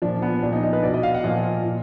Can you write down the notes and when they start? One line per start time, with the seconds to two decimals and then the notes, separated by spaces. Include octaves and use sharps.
0.02 A#2 F3 D4
0.22 B3
0.42 A#2 D4
0.46 F3
0.53 D#4
0.64 D#4
0.73 B4
0.83 B2 D5
0.94 D#5
1.03 F5
1.14 F#5
1.24 A#2 F3 D#5
1.64 A#2